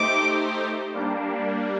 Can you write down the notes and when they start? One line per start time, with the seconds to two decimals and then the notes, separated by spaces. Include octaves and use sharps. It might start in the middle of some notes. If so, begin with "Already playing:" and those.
Already playing: A3 D#4 G4 C5 D6
0.93 G3 A#3 D4